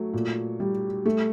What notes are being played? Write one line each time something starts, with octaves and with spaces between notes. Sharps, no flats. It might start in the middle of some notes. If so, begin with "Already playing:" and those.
Already playing: F#3 A3
A#2
G3
A3